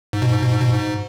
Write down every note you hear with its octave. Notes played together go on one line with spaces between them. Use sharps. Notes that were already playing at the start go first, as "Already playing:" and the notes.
G#2
B2
G#2
B2
G#2
B2
G#2